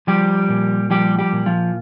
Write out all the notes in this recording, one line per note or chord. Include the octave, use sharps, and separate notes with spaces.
F3 G3 G4
A#2
F3 G3 G4
G3 G4
A#2
F3 F4